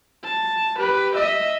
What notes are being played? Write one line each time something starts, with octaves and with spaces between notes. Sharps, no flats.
A5
G4 B4
D#5 E5